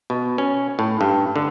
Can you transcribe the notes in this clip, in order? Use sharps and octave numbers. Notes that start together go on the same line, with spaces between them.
B2
C#4
A2
G2
D3